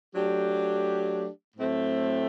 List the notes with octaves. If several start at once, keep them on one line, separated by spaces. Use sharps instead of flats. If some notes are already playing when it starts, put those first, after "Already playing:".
F#3 A3 D4 G4
A2 F#3 A3 C4